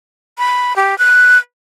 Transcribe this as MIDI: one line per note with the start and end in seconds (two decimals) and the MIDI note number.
0.38 0.76 83
0.76 0.98 67
0.98 1.37 90